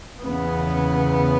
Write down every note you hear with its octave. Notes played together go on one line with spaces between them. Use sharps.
E2 C#3 B3